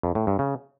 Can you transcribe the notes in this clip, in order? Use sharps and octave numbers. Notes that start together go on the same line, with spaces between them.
F2
A2
G2
C#3